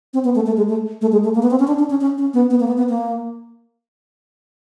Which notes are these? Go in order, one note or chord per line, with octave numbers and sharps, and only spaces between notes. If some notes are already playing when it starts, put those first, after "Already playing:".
C4
B3
A3
A3
G#3
A3
A3
G#3
A3
A#3
B3
C4
C#4
D4
D4
C#4
C#4
C#4
B3
B3
A#3
B3
B3
A#3